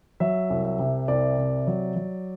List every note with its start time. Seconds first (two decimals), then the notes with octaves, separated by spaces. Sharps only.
0.20 F#3 E5
0.50 C2
0.65 E5
0.79 C3
1.08 C2 D5
1.38 C3
1.67 F#3
1.96 F#3